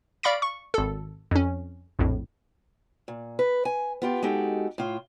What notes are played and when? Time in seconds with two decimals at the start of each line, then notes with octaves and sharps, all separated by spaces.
0.23 D5 F5 B5 C#6 A#6 D7
0.42 C#6
0.74 G#1 A4
1.31 F2 C#4
1.99 A#1 F2 A2
3.08 A#2
3.39 B4
3.65 G#5
4.02 B3 F4 G4
4.22 G#3 D#4 F#4 G4 A4
4.78 A2 F4